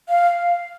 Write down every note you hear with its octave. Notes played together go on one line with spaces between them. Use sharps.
F5